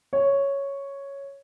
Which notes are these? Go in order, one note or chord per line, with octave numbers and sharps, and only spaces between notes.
C#5